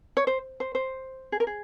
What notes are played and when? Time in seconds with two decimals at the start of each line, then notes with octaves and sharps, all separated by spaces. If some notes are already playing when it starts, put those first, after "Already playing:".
0.17 C#5
0.27 C5
0.60 C5
0.75 C5
1.32 G#4
1.40 A#4
1.47 G#4